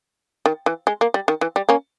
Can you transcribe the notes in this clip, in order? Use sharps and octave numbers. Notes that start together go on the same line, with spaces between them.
D#3
E3
G#3
A#3
G3
D#3
E3
G3
A#3 C#4